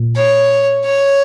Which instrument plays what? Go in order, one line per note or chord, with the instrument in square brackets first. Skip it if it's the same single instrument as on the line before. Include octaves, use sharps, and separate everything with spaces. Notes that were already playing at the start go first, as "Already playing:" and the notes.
Already playing: [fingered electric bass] A#2
[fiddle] C#5
C#5